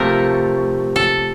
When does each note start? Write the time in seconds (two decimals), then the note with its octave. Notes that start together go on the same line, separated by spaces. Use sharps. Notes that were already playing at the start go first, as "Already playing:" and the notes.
Already playing: C3 F3 A3 A#4
0.96 A4